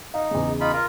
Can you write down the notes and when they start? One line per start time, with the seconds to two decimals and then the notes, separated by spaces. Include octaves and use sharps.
0.14 D#4 F5
0.31 E2 C#3
0.61 D#4 F4 B5
0.73 F4 A#4